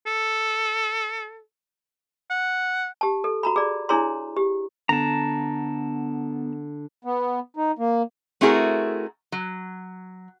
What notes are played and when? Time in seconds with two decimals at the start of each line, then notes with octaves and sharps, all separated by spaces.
0.07 A4
2.31 F#5
3.01 G4 A5
3.24 A4
3.43 F#4 A#5 B5
3.56 G#4 D5
3.89 D4 E4 G#4 C#5 A#5 C6
4.37 G4
4.89 D3 B3 A5 A#5
7.05 B3
7.56 D#4
7.79 A#3
8.41 A3 C4 E4 F#4 G#4 A#4
9.32 F#3